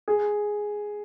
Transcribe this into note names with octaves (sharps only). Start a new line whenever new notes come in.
G#4